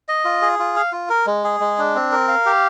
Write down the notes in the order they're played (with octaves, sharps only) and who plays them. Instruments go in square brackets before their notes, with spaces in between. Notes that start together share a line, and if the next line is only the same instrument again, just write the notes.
[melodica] D#5
F4
G#4
F4
F5
F4
A#4
G#3
G#4
G#3
D4
C4
A#4
F5
G4